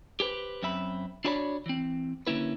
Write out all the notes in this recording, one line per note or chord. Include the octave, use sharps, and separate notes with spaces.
G4 G#4 B4 C5
F#2 C4 E5 B5
D4 E4 F#4 C#5 D5 B5
E3 C4
D3 A#3 C#4 E4 B4